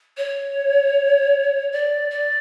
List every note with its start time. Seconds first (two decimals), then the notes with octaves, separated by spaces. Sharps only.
0.17 C#5
1.72 D5
2.11 D5